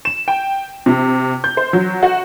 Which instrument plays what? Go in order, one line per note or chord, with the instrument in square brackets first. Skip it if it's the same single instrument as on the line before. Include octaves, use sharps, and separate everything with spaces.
[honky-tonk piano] E7
G5
C3
G6
C5
F#3
F#4